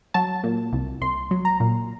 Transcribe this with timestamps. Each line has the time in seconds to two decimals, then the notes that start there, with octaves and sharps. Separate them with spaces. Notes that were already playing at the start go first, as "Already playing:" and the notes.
0.14 F#3 A5
0.43 A#2
0.73 C2
1.01 C2 C6
1.31 F#3
1.45 A#5
1.60 A#2